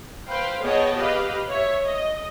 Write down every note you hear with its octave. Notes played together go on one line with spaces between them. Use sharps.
B4 C5 F5 G5
B3 G#4 C#5 D#5 G5 A5
G4 B4 D#5 F5
C#5 E5
D#5